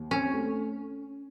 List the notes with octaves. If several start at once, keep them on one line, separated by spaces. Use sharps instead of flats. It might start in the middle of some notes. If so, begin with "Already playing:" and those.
Already playing: D#2
C4 C#4
A3